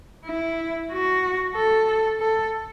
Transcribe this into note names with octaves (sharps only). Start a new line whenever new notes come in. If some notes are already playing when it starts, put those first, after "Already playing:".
E4
F#4
A4
A4